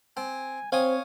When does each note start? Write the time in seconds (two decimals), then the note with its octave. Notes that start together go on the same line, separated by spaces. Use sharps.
0.17 C4 G#5
0.72 C4 C5 C#5 F5 G#5 D#6